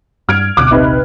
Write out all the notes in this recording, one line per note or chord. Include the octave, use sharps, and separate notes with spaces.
G2 F6 G#6 D7
D2 B2 D6 F6 F#6
D#1 A#1 C3 D#4 B4